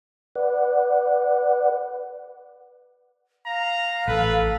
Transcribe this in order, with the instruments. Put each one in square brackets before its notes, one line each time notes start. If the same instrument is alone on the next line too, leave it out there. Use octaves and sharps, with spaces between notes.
[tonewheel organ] B4 D5 F#5
[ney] F5 [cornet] A#5
[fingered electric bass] A1 [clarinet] A4 [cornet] B4